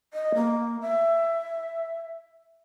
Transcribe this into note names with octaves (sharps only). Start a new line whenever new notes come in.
D#5
A#3
E5